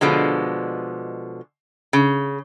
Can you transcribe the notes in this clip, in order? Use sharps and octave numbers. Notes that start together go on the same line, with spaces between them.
B2 D3 F3 G#3
C#3